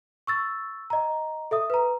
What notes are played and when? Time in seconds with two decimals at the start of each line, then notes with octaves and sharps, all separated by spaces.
0.27 C#6 E6 A6
0.90 D#5 A#5
1.51 A4 E5 D#6
1.70 B4 A#5